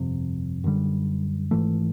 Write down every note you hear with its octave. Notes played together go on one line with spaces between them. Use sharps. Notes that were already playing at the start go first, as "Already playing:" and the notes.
Already playing: G1 F2 C3
F#2 D3 G3
G#1 G#2 E3 A3